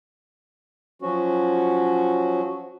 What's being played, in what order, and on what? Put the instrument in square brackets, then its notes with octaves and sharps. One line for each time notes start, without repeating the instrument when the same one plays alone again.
[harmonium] F3 F#3 C#4 F#4